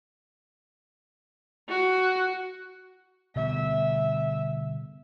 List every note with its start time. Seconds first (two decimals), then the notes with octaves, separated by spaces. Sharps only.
1.69 F#4
3.36 B2 D3 G3 E5